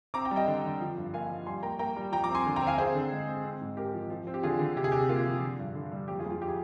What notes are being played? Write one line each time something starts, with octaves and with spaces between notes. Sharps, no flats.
C4 A#5 D6
G5 A#5
G3
D#5 G5
D3
D3
F3
G2
A#3 F5 G#5
F3
G3 G#5 C6
A#3 G5 A#5
A#3 G5 A#5
G3
F3 G5 A#5
A#5 D6
C4
G#5 C6
D3
G5 A#5
C4
F5 G#5
C4 G#4 C5
D3
G#3
C4
C4
G#2
C4 G4 A#4
F3
F3
C4
G4
D3 F4 G#4
D3
C3 G4
G#4
C3 G4
A#3 F4
F3
D3
G2
D3
G3
F2 G4
F4 G#4
F2
F4
G4
G#4